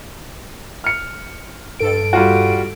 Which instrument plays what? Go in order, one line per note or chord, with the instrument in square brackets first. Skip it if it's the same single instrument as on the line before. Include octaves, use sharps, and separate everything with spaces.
[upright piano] F6 C#7
[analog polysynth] G2 A4 D7
[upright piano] G3 F4 F#4